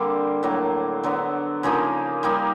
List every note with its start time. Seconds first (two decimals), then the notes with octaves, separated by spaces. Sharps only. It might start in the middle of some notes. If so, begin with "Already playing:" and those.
Already playing: D3 G3 A#3 C4
0.43 A2 F#3 A#3
1.03 D3 F#3 B3
1.63 C#3 F3 A#3 D#4
2.23 G3 A#3 D#4